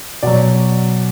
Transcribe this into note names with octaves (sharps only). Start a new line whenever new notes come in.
B2 F#3 D5